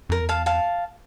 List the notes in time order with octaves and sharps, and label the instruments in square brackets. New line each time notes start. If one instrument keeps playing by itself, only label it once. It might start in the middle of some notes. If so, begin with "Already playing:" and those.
[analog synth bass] F2 [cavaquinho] A#4
[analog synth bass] E2
[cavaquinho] F5 A5
F5 A5